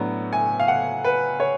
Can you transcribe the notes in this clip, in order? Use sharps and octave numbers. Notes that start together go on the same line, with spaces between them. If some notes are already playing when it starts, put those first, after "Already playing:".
Already playing: A2 F#3 B3 D4
G#5
F5
F#5
B4
C#5